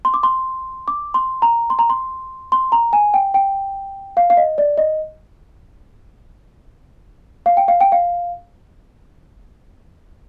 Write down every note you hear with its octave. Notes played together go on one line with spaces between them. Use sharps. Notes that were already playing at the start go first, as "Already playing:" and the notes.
C6
D6
C6
D6
C6
A#5
C6
A#5
C6
C6
A#5
G#5
G5
G5
F5
F5
D#5
D5
D#5
F5
G5
F5
G5
F5